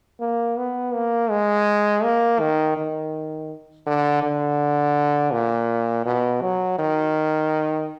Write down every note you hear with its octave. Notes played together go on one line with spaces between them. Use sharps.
A#3
B3
A#3
G#3
A#3
D#3
D#3
D3
D3
A#2
B2
F#3
D#3